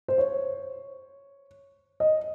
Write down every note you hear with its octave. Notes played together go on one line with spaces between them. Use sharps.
C5
C#5
D#5